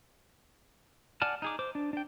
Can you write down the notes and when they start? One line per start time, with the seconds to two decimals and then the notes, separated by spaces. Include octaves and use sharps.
1.22 D5 F#5 G#5 A5 F6
1.42 D#4 G#4 D6
1.59 C5 D6
1.75 D4
1.93 D4 G5